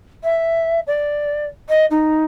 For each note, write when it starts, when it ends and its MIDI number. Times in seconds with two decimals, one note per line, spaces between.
0.24 0.80 76
0.87 1.46 74
1.69 1.86 75
1.90 2.24 63